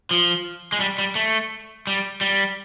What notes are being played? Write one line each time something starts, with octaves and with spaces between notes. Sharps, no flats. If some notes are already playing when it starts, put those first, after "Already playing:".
F3
G#3
G3
G3
A3
G3
G3